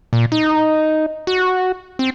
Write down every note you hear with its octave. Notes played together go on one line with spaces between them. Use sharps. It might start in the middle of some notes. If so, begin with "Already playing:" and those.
A#2
D#4
F#4
C4